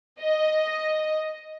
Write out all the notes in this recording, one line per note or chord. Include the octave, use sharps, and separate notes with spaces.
D#5